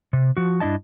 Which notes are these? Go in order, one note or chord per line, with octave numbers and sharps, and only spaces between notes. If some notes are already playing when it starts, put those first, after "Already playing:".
C3
F3 F#4
G2 D4 E4 D#5 A5